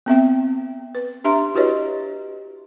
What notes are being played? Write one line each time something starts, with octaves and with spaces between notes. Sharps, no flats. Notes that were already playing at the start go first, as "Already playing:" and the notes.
B3 C4 E5 G5
B4
D4 G4 E5 A#5 C6
E4 F#4 G4 B4 C#5 D#5